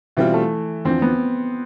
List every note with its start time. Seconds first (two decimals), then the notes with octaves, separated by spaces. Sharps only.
0.17 B2 E3 G3 C4 F4
0.34 A3
0.85 E2 D3 F3 C4
1.02 B3